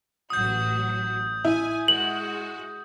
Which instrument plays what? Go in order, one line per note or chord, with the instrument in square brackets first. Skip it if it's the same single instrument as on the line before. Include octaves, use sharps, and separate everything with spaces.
[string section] A1 F#3 F#4 [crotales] D#6 G6
[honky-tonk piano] E4 [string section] G#5
[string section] G#3 F#4 [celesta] F#7